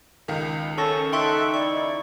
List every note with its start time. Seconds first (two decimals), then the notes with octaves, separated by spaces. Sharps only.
0.28 C#2 D#3 D#4
0.78 C#4 A4 A5 C#6 A#6
1.13 D#4 A4 E5 G5 C6 C#6 F#6
1.54 E4 D5 C#6